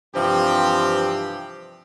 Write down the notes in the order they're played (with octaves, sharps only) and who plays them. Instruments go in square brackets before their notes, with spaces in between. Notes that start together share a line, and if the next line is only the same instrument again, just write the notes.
[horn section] G2 C3 E3 F3 C4 G4